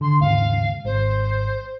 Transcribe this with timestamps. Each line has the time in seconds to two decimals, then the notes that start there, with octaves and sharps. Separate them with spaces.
0.01 D3 C6
0.20 D#2 G#2 C#3 F5
0.85 G#1 C5